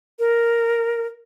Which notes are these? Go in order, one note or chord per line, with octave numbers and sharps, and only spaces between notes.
A#4